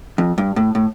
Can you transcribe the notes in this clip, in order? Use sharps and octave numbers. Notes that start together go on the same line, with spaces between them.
F2
G2
A2
A2